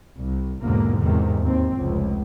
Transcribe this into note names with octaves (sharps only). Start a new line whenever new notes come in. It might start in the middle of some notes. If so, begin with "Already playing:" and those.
C2
B1 E2 G#2 D3 A#3
E2 G#2 C3 D#3
D#2 C4
F1 C#2